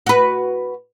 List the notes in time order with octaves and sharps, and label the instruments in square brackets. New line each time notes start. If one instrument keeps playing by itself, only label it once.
[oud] F#4 B4